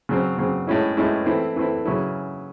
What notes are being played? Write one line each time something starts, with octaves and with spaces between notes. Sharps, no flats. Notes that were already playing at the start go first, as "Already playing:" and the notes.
C#3 F#3 C4
C#3 F#3 C4
A2 G#3 C#4 E4
A2 G#3 C#4 E4
E3 A3 C4 E4
E3 A3 C4 E4
C#3 F#3 C#4 E4